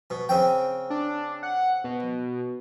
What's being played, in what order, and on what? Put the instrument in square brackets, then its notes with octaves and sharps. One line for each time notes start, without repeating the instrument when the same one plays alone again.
[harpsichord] B2
C#3 C4 G5
[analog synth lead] D4
F#5
B2